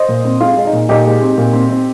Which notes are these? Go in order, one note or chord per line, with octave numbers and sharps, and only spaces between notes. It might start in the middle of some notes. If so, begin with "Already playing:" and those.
Already playing: C5 D#5
A#2
C4
G#3 F4
G#3
D#4
A#2
A#2 D#4 G4
G#3
C4
A#2
C4
C4